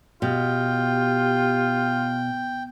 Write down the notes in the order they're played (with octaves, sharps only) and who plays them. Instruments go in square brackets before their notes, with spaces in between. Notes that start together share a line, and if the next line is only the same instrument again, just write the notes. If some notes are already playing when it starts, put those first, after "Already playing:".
[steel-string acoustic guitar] B2 [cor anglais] F4 [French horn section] G4 [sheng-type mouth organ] G5